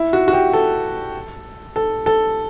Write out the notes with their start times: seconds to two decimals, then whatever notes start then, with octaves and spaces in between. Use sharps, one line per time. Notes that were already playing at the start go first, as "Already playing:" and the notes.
Already playing: E4
0.13 F#4
0.28 F#4
0.33 G4
0.53 A4
1.76 A4
2.06 A4